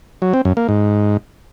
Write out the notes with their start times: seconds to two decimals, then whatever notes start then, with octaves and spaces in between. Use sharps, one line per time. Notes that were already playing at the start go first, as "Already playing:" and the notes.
0.22 F#3
0.34 C4
0.45 F#2
0.57 A#3
0.69 G#2